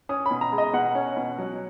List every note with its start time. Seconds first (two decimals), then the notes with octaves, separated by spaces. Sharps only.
0.09 C#4 D#6
0.26 B5
0.31 B2
0.41 A#5
0.52 G#3
0.58 D#5
0.73 B2 F#5
0.95 C#4
1.17 B2
1.38 F#3